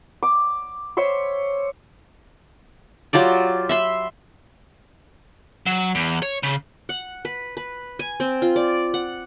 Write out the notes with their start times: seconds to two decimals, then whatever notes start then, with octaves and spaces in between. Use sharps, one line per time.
0.23 D6
0.97 C5 C#5 E5 C6
3.13 F#3 F4 G4 D5
3.69 E5 B5 C6
5.66 F#3
5.95 E2
6.22 C#5
6.43 C#3
6.89 F#5
7.25 B4
7.57 B4
7.99 G#5
8.20 C4
8.42 F4
8.56 D5
8.94 F#5